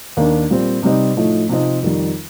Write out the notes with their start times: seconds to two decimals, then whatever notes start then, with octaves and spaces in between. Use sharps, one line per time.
0.17 D#2 D#3 A#3 D4
0.50 A#2 G3 C4
0.83 C3 G3 C4 D#4
1.17 A2 F3 A3 D#4
1.49 C3 F3 C4 D#4
1.83 F2 D#3 G3